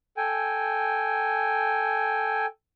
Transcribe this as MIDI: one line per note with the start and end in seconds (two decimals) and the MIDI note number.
0.17 2.46 69
0.17 2.46 79
0.17 2.46 80